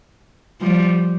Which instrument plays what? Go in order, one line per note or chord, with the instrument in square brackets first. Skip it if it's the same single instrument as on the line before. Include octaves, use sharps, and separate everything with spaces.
[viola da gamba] F3 G3